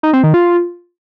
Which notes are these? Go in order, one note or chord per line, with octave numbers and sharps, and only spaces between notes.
D#4
C4
D#3
F4